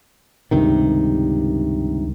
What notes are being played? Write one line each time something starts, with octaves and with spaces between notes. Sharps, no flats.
C#2 G2 C3 D#3